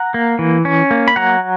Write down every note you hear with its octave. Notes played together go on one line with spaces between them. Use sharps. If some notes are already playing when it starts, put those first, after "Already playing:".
Already playing: F#5 A#5
A#3
E3
C#4
A#3
B5
F#3 F#5 A#5